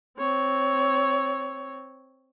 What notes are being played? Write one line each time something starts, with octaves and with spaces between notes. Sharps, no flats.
C4 C#5